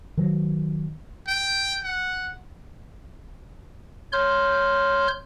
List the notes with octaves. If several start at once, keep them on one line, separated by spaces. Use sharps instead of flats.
D#3 F#3
G5
F#5
C#5 C6 F6 G6